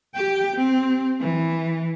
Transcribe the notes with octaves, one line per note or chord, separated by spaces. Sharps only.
G4 G5
C4
E3